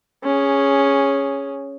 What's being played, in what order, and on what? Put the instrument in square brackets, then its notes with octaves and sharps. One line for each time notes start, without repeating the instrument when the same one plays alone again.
[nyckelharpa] C#4 G#4